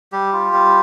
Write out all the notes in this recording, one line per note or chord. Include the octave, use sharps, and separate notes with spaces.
G3 G4
F4
G3